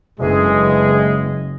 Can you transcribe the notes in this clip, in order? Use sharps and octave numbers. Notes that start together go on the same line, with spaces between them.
F#1 D2 E3 G#3 G#4